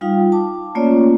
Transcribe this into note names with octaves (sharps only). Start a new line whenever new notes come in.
G3 D#4 F4 F5 G5
A5 D6
A3 A#3 C#4 F4 C#5 D5